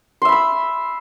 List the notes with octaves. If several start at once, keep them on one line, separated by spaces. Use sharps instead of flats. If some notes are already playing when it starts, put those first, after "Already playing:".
E5 B5 C6 E6